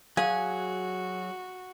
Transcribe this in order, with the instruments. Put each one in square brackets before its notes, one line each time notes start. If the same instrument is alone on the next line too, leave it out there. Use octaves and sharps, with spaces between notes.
[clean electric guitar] F#3 G#4 [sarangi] F#4 [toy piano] F5 [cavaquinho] G#5